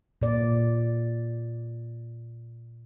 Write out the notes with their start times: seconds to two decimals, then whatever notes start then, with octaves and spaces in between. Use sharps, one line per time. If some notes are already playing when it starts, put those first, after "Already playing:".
0.22 A#2 D5